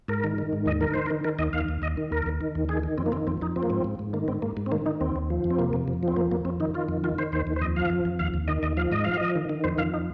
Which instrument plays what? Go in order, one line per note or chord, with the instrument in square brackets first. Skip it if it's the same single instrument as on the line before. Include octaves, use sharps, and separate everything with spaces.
[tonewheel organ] G#2 A#4
D#3
D#3
G#2
D#2 D#5
D#3 A#4
D#3 C5
A#4
D#3
D#3 A#4
D#2 D#5
D#2 F5
D#2
D#2 D#5
D#3
D#2 A#4
D#2
D#3
D#2
D#3 G#4
D#3
F2 C4
A#3
D#3 C4
F2 C4
F2 D#4
F3 C4
A#3
G#2 C4
G#2
G#2
D#3 A#3
G#2 C4
G#2 A#3
G#2
C4
D#3 A#3
D#3 D#4
D#2 C4
D#2
F3
F2
C4
C3 A#3
F2
F2
F3
C4
F2 A#3
F2 A#3
F2 C4
D#3 D#4
D#3 F4
F2
D#3 F4
D#3 C5
D#2 C5
D#2
C5
F2 D#5
F3 F5
F2
F2
D#2 F5
D#2
D#3 D#5
D#2 D#5
F3 F5
G#2 D#5
F3 F5
F3 D#5
D#3
D#3
F2 C5
F2 F5
D#4